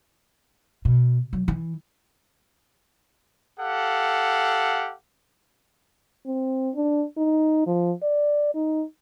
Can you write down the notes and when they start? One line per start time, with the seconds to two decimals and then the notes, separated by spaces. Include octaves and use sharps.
0.85 B2
1.33 F#3
1.48 E3
3.59 G4 A4 F5 F#5
6.26 C4
6.75 D4
7.17 D#4
7.67 F3
8.03 D5
8.55 D#4